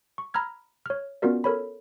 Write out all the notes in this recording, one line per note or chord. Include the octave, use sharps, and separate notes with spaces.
C#6
A#5 B5 E6 F6 G#6
C#5 F6
B3 C#4 F4 F#4 A#4 D5
A4 A#4 C#5 B5